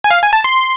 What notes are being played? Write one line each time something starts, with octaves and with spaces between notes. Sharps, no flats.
G#5
F5
G#5
A5
C6